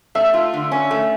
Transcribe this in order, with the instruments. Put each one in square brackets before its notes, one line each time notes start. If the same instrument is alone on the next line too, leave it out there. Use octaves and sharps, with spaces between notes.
[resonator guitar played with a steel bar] A3 [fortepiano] E5
[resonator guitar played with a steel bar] F4
D3
C#4
A3